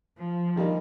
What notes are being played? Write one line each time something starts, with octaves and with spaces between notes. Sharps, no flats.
F3
D#3 G3 A#3 D#4